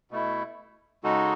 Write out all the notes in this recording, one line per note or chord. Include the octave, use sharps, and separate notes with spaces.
B2 A3 E4
C#3 G#3 D#4 F#4 A4